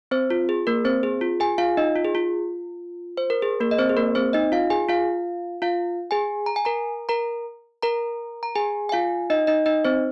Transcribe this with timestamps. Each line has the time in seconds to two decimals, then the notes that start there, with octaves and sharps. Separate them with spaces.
0.11 C4 C5
0.30 F4
0.49 G#4
0.67 A#3 A#4
0.85 C4 C5
1.03 G#4
1.21 F4
1.40 G#4 G#5
1.58 F4 F5
1.77 D#4 D#5
1.96 F4
2.05 G#4
2.15 F4
3.17 C5
3.30 A#4
3.42 G#4
3.60 A#3 A#4
3.71 D#5
3.79 C4 C5
3.89 G#4
3.97 A#3 A#4
4.15 C4 C5
4.33 D#4 D#5
4.52 F4 F5
4.70 G#4 G#5
4.89 F4 F5
5.62 F4 F5
6.11 G#4 G#5
6.46 A#5
6.56 G#5
6.65 A#4 A#5
7.09 A#4 A#5
7.82 A#4 A#5
8.43 A#5
8.56 G#4 G#5
8.89 G#5
8.92 F4 F5
9.30 D#4 D#5
9.47 D#4 D#5
9.66 D#4 D#5
9.84 C4 C5